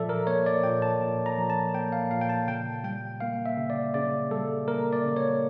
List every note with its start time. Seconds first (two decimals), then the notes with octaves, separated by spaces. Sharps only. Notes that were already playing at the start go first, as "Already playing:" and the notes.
Already playing: A#2 F3 A4 D5 E5
0.09 A#4
0.27 A#3 C#5
0.46 D5
0.64 A#2 G5
0.82 A5
1.00 A#2
1.26 A#5
1.38 F3
1.50 A5
1.74 A#3 G5
1.92 F5
2.11 A#2 F5
2.21 G5
2.29 A5
2.47 C#3 G5
2.84 G3 G5
3.21 A#3 F5
3.46 E5
3.58 C#3
3.70 D5
3.94 C#3 D5
4.31 G3 A4
4.68 A#3 A#4
4.93 D5
5.05 C#3
5.17 C#5